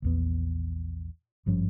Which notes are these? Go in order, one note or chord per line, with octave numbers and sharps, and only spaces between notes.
A#1 E2 B3
G#1 G2 F3 C#4